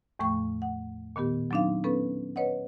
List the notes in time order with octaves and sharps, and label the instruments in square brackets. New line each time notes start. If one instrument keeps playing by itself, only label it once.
[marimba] E2 A2 F3 A3 G5 C#6
F#5
A#2 D#3 B3 G4
F#3 C4 D4 D#4 F5
B3 C#4 A4 B4
B4 C#5 D#5 F#5